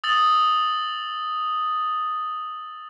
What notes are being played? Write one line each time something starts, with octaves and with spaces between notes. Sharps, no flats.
D#6 E6 A6 F#7